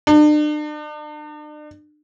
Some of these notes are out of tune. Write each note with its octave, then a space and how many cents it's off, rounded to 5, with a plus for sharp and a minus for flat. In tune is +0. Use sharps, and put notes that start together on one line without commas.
D4 +40